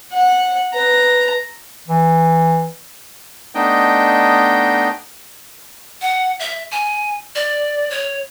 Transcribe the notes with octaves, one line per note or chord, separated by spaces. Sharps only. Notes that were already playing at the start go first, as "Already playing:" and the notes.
F#5
B4 A#5
E3
A3 B3 D4 D#4 D#5 G5
F#5
E5
G#5
D5
C#5